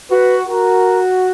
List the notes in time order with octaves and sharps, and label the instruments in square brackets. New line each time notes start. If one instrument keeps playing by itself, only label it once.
[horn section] F#4 [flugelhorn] B4
[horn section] F#4 [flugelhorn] A#4